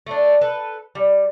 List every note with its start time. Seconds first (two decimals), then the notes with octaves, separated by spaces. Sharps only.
0.07 A3 D4
0.41 A4 B4
0.95 G3